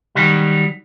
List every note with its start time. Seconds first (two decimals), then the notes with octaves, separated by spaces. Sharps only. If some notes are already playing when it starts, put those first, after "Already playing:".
0.15 D#3 F#3 G3